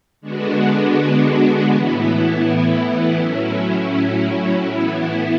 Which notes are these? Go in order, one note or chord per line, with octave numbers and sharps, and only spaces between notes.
D3 G#3 B3 D4 F#4
A2 E3 B3 E4
A2 F#3 C#4 E4
A2 E3 B3 E4